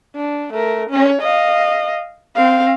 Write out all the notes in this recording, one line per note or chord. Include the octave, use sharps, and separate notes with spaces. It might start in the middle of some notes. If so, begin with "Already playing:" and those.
D4
A3 A#4
C#4 C#5
D#5 F5
C4 F5